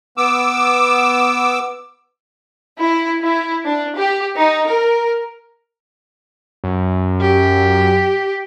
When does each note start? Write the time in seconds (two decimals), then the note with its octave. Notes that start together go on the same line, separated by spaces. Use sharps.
0.17 B3 D6 E6
2.79 E4
3.22 E4
3.65 D4
3.97 G4
4.37 D#4
4.68 A#4
6.64 F#2
7.21 G4